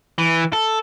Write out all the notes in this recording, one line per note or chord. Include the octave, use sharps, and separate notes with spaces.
E3
A4